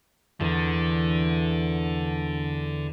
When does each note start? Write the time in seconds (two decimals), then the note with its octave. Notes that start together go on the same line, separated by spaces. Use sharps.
0.41 E2 D3